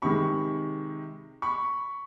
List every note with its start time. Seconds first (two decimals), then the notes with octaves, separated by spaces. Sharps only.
0.02 C3 D#3 G#3 B5 C#6
1.42 B5 C#6